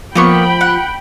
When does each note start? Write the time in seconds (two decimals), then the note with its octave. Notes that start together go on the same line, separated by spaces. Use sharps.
0.15 F3 A#3 B3 G5 B5 C#6
0.61 F#5